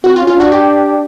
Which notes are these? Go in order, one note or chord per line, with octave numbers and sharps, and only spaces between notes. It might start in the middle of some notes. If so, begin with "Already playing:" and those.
C4 F#4
F4
C#4
F4
D4 F#4
G4